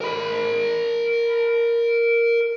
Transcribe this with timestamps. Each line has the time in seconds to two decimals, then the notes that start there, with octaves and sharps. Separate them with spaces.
0.01 A#4 B5